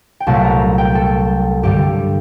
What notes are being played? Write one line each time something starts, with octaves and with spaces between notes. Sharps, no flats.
G5
C2 A#2 F#3 A3 A5
A#5
G5
A4
G2 D3 G3 G4